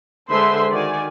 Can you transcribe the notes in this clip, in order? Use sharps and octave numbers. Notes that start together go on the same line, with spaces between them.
D3 G#3 B4 C5 E5 C6
D#3 F#4 D5 G#5